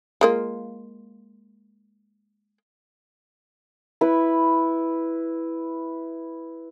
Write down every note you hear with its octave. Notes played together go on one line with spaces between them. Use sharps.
G#3 A#3 F4
E4 B4